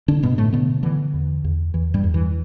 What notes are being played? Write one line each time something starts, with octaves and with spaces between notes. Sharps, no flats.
D3 D4
G2 B2 B3
A2 A3
B2 D3 B3
D3 E3
E2
E2
E2 E3
G2 G3
E2
E3